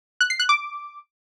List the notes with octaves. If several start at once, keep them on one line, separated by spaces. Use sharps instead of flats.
F#6
C7
F#6
D6